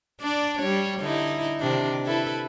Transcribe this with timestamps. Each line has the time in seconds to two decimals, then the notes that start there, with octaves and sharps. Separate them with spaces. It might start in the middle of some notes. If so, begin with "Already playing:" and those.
0.21 D4 D5
0.59 G3 C#5
1.01 D3 D#4 E4
1.60 C3 D#3 D4
2.06 E4 A4 B4